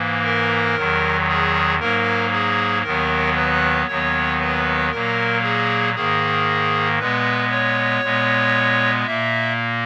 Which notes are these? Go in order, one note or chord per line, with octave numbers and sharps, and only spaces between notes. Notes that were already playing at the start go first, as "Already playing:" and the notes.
Already playing: G#2 E3 A#3
A#4
E2 D#3 F#3
G#4
G#2 F#3 A#3 A#4
G#4
D#2 D#3 F#3 B3 A#4
B4
D#2 D#3 F#3 B3 C#5
B4
A#2 F#3 A#3 A#4
G#4
G#2 D#3 A#3 G#4
A#2 G#3 B3 B4
C#5
A#2 G#3 B3
A#2 A#3 E5